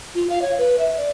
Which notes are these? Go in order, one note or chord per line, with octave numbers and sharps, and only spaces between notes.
F4
F5
C#5
B4
E5
D5